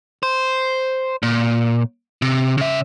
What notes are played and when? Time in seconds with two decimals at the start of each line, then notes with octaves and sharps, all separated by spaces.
0.23 C5
1.23 A#2
2.22 C3
2.58 C#3 E5